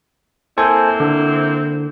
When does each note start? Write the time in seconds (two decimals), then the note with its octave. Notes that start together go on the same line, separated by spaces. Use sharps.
0.58 A#3 C4 E4 A4 C5 G#5
1.00 D3